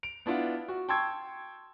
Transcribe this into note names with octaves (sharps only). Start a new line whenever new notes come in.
D7 F7
B3 D4 E4 F4 F#5
F#4
G5 A5 C6 C#6 E6 G#6